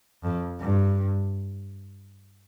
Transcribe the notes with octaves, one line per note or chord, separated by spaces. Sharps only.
F2
G2